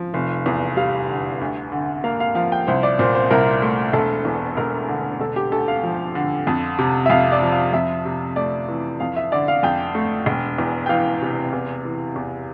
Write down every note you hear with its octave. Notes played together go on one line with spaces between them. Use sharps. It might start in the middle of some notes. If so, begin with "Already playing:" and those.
Already playing: F3
F1
E2
G3 F5
D3
D2
D3
A#3 F5
F5
F3 F5
G5
C2 C5
D5
A#2 C5
C5
C2 A#4
A3
E1 A4
E2
E1 A#4
D3
E1 A4
G4
D2 A4
F5
F3
D3
F2
C3
E5
F2 F5
D5
F3
F5
F2 E5
C3
A3 D5
E3
F2 F5
E5
D3 D5
F5
F2 G5
A3
E1
E2
G5
E3 F5
C3
E2
E3
E2